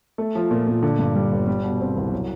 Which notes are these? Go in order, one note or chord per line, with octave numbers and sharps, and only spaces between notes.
A3
F3
A#2
A#2
D3
G2
G3
G1
G3
B2
C4
C2
F#3